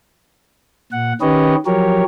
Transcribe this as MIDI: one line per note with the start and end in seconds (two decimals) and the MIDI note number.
0.92 1.13 46
0.92 1.13 78
1.21 1.55 51
1.21 1.55 61
1.21 1.55 67
1.21 1.55 71
1.21 1.55 73
1.21 1.55 75
1.66 2.04 53
1.66 2.04 54
1.66 2.04 67
1.66 2.04 70
1.66 2.04 73